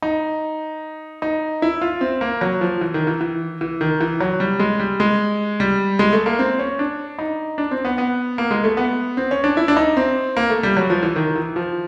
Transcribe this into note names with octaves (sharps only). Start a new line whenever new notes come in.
D#4
D#4
E4
F4
C4
A#3
F#3
F3
E3
D#3
E3
E3
E3
D#3
E3
F#3
G3
G#3
G3
G#3
G3
G#3
A3
A#3
C4
C#4
D4
D#4
D4
C4
B3
B3
A#3
G#3
A3
B3
C4
C#4
D4
E4
D4
D#4
C4
A#3
A3
G3
F#3
F3
E3
D#3
E3
F3